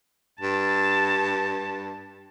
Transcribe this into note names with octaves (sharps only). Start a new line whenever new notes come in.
G2 A5